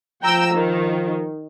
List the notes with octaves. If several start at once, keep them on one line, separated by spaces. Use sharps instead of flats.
F3 G5 A#5 E6
D#3